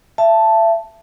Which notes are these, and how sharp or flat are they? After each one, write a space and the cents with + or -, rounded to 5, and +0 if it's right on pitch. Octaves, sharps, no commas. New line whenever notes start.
E5 +30 A5 +0